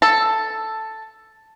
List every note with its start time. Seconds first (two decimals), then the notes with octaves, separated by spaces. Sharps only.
0.02 A4